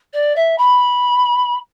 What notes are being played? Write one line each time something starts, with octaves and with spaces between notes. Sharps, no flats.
D5
E5
B5